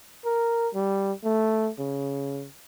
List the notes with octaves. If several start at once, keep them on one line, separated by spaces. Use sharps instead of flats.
A#4
G3
A3
C#3